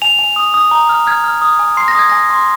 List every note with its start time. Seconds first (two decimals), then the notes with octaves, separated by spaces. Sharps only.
0.02 G#5 F7
0.19 G#5
0.36 D#6
0.54 D#6
0.71 A#5
0.89 F6
1.07 F6 G#6
1.24 F6
1.42 D#6
1.59 G#5
1.77 C6 C7
1.88 A#6
1.95 D#6 G#6
2.10 G#5 A#6
2.30 C6